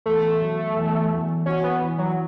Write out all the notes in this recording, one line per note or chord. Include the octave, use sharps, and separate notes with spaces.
E2 A3
F#3
E2
E2
C#4 F#4
B3
E3
F#3